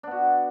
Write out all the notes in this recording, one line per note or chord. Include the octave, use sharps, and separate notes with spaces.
B3 D4 F#4